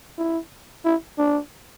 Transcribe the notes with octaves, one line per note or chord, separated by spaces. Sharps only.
E4
E4
D4